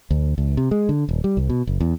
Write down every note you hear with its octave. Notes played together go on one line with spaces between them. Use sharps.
D2
C#2
C3
G#3
D3
D#1
G3
C2
B2
F#1
E2